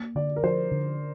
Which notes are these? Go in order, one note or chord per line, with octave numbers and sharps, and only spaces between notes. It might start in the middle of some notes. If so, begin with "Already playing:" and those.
Already playing: A#3
D3 D5
A#4
F3 C5
D3